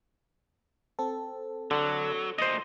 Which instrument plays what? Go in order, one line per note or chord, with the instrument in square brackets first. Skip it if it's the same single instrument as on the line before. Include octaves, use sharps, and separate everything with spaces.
[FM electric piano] C4 A4
[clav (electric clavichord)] D3 [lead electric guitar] F#3
[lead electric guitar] D2 A#2 [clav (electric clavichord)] C5 D#5